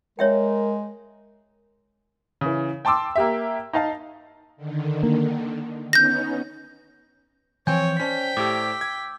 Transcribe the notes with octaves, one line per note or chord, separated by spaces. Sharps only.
G#3 A#4 C#5 E5 G5
C#3 E3
G5 A5 C6 D6 E6
A#3 G4 E5
D#4 D#5 F5 A5
D3 D#3
A#3
B3 C#4 D#4 G6 A#6
E3 F3 C4 C#5 G5 G#5 G6
C#4 C5 D5 G5 A5 B6
A2 G4 D6 E6
G#6